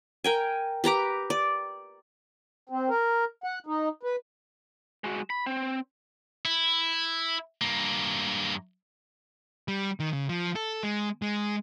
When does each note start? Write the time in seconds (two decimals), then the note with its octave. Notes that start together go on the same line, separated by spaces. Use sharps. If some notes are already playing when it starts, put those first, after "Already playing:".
0.24 A#4 G5 G#5
0.84 G4 B4 A#5 D6
1.30 D5
2.69 C4
2.89 A#4
3.44 F#5
3.67 D#4
4.03 B4
5.04 G#3 F#4
5.30 B5
5.46 C4
6.45 E4
7.61 G2 A#3
9.68 G3
10.00 D#3
10.13 C#3
10.29 F3
10.56 A4
10.83 G#3
11.22 G#3